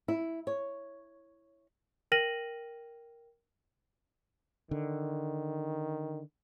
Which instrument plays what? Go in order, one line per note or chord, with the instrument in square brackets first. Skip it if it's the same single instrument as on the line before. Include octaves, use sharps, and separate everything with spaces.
[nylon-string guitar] E4
C#5
[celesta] A#4 G5 F6 A#6 D#7 F#7
[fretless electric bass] D3 [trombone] D#3